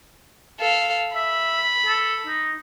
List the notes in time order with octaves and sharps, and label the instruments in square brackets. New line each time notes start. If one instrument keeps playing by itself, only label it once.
[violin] A4 F5
[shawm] E5 [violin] B5
[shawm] A4
D#4